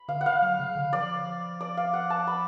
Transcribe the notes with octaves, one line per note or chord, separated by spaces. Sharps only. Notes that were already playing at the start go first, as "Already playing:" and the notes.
Already playing: B5
D3 F5
F#5
F5
F#3
C#3
D3
F3 D5
D5
F5
F#5
A5
B5